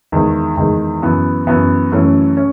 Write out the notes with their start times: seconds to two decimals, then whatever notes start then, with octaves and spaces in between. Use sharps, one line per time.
0.12 E2 D#3 G#3
0.57 E2 D#3 G#3
1.02 F#2 E3 B3
1.47 F#2 E3 B3
1.92 F#2 E3 A3 C#4
2.37 C#4